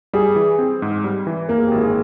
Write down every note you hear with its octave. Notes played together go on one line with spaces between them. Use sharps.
G3 G#4
E3
C4
G#2
G3
E3
A#3 A#4
G#4
G#1 G4
G#4